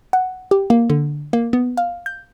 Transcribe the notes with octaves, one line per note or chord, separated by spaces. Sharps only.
F#5
G4
A#3
D3
A#3
B3
F5
G6